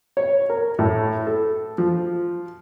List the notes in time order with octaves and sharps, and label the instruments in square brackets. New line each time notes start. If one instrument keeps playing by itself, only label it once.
[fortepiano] C#5
A#4
A2
A4
F3